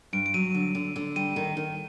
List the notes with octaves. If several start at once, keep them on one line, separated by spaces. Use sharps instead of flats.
G2 D7
D7
F#3 D#7
D3
D3
D3
G3 D#7
D#3
D#3